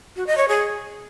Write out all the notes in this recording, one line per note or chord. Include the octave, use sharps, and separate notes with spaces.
F#4
D#5
C#5
G#4